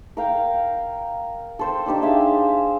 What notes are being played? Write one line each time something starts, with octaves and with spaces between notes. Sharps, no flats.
A#4 F5 G5
A4 C5 G5
D4 D#4 G4 C5
G#4 E5 F5